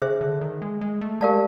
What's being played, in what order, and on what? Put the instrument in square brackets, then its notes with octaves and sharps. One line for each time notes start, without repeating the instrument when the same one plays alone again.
[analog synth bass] C#3 [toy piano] G#4 C5 E5
[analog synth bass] D3
D#3
G#3
G#3
A3
[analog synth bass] G#3 [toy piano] G4 A#4 D5 F5 A5